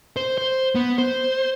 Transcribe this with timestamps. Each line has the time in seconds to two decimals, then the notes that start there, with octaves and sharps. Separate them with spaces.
0.16 C5
0.38 C5
0.75 B3
0.98 C5